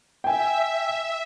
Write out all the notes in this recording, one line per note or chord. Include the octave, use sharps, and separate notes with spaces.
E5 G5 G#5